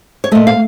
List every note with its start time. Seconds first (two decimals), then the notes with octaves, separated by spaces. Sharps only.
0.24 C#5
0.32 A#2 A3 D#5
0.47 F5